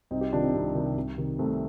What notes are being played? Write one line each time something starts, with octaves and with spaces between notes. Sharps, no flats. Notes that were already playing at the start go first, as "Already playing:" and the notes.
C2 C4 D#4
D#4 G4
C3 D#3 D4 F4
C4 D#4
C2
C3 D#3
C2
C3 D#3
C2 A3 C4